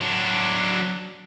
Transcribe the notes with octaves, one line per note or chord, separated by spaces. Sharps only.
F#3 D4